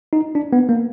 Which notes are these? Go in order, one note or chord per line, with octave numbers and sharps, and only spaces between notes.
D#4
D4
B3
A#3